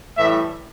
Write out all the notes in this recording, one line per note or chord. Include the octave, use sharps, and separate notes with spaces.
A2 E3 G3 E5